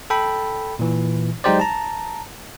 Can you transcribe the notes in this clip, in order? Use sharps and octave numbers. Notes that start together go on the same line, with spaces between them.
A4 G5 B5
A#2 E3
F#3 G#3 D#4 G4 C5 D5
A5 A#5